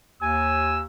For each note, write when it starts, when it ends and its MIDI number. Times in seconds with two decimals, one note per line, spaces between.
0.22 0.85 39
0.22 0.80 80
0.22 0.84 88